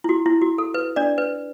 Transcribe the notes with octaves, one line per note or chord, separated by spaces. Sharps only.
E4
F#4
E4
F#4
A4
B4
D4 D5
B4